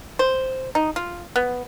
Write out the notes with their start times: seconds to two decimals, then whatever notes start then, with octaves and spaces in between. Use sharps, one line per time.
0.19 C5
0.75 D#4
0.96 F4
1.36 B3